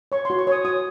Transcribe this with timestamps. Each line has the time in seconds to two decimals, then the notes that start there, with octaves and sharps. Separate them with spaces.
0.12 C#5 C#6
0.25 F#4 C6
0.39 C#6
0.47 C#5 D#6
0.65 F#4 D#6